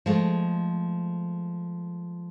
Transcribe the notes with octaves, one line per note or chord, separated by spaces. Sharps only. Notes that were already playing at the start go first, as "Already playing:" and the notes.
F3 G#3 A3